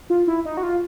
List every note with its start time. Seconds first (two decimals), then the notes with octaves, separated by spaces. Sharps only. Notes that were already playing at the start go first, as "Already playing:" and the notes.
0.10 F4
0.27 E4
0.45 D#4
0.57 F#4
0.63 F4